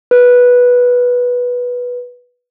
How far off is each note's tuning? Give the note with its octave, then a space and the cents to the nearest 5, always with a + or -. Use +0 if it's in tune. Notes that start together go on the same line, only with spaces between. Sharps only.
B4 -10